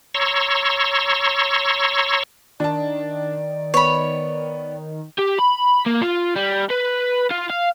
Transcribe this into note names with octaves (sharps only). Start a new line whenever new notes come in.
C#5 A#5 C6 C#6 E6
D#3 D4 D5 A5
B3 C#5 B5
G4
B5
A#3
F4
G3
B4
F4
F5